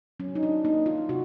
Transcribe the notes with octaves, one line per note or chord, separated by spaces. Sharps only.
F#3 C#4
D#4
D4
A#3 D#4
F4
C3 F#4